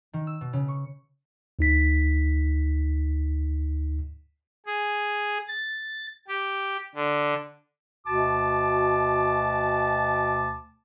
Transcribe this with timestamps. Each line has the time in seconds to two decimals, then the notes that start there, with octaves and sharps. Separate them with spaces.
0.13 D#3
0.27 E6
0.41 B2
0.53 C#3
0.68 C#6
1.59 D2 D#4 B6
4.66 G#4
5.48 A6
6.28 G4
6.95 D3
8.06 D2 B2 F#4 A5 D6